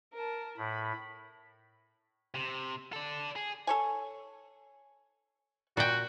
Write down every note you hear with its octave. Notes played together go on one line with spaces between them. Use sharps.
A#4 A5
A2 B5
C3
A4 D5
G#4
A4 C#5 G#5
A#2 F#4 G5